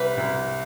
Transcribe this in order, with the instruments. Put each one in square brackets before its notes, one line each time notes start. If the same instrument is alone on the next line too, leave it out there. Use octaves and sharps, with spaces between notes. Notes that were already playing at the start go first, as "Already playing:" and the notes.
Already playing: [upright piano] C2 G3 [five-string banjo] B4
[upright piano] C2